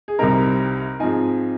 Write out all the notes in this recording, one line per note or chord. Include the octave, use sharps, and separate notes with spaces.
G#4
C2 C3 G3 C4 D#4 A#4
G#2 F3 C4 D#4 G#5